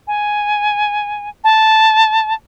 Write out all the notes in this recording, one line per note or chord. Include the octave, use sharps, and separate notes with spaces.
G#5
A5